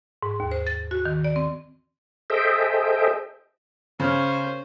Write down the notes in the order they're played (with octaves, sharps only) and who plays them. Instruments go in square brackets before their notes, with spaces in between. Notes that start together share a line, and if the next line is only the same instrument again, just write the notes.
[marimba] G#2
D#2
C5
A6
F#4
D#3
D5
C4
[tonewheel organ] G#4 A4 C5 D#5 E5 G5
[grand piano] C#3 F6 [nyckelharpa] C#4 C5